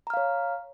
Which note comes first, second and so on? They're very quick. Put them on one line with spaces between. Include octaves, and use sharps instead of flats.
A#5 F6 F5 C#5